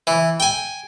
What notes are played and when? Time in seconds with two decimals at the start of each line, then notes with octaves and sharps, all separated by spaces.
0.07 E3
0.40 G5 G#5